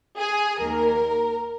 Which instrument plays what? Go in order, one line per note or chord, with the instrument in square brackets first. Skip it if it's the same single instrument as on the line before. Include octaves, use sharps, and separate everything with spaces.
[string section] G#4
D#2 D#3 A#3 A#4